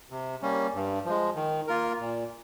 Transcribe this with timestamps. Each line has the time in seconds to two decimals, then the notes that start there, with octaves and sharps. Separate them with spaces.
0.10 C3
0.42 G3 A#3 C#4
0.74 G2
1.05 F3 G#3
1.36 D#3
1.67 A#3 F4 A#4
1.99 A#2